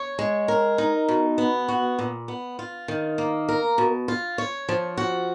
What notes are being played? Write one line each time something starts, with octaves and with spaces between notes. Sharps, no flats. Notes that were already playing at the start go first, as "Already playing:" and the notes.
Already playing: C#5
G#3
A#4
D#4
B2
B3
F#4
A#2
B3
F4
D#3
A#3
A#4
B2
F4
C#5
F3
F#4